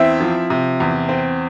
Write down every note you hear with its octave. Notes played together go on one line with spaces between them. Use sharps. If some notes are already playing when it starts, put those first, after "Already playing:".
Already playing: E2 C4 E4 E5
F3
C3
E2
C4